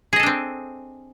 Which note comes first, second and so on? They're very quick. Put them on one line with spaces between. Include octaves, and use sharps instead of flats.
G#4 D#5 A4 D4 C4